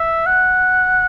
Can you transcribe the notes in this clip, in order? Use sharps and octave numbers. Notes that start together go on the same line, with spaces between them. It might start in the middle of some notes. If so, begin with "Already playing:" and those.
Already playing: E5
F#5